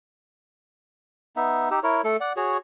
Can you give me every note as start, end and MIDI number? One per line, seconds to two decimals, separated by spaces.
1.36 1.69 59
1.36 1.69 63
1.36 1.69 76
1.71 1.80 63
1.71 1.80 67
1.71 1.80 88
1.83 2.02 64
1.83 2.02 70
1.83 2.02 73
2.04 2.17 57
2.04 2.17 69
2.20 2.33 74
2.20 2.33 78
2.37 2.57 66
2.37 2.57 68
2.37 2.57 73